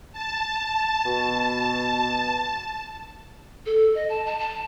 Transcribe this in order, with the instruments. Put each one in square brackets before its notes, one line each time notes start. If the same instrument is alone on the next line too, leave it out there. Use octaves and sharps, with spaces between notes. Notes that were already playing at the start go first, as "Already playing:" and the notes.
[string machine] A5
[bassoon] B2
[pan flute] A4
D#5
A5
A5
A5